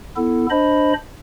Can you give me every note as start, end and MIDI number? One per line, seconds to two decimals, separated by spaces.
0.16 0.46 59
0.16 0.46 64
0.16 0.46 69
0.50 0.93 62
0.50 0.93 72
0.50 0.93 75
0.50 0.93 83